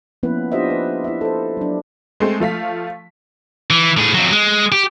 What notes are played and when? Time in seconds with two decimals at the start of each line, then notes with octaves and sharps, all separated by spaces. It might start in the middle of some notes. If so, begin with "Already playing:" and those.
0.23 F3 A#3 B3 C#4 E4 B4
0.52 D4 F4 G4 C5 D#5 E5
0.70 B4
1.04 E4 E5
1.21 A4 C5
1.57 F#3 D4
2.20 G#3 A3 C4
2.40 F3 A3 F5 B6
3.70 E3
3.97 A2 G#4
4.15 F2 F#3
4.32 G#3
4.72 G4